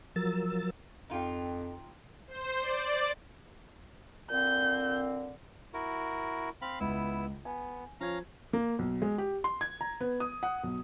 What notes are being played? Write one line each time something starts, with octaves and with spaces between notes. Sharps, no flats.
F3 F#3 A#4 E6 A6
F2 D#4 F4 G4
C5
D5
A#2 D3 C4 G6
E4 F#4 A#4
C4 F5 B5
C#2 B3 E4 E6
B3 G#5
F3 C#4 F5 A#5 G#6
A#3
B1
G#3
G4
C6
G#6
A#5
B3
D#6
F#5
B1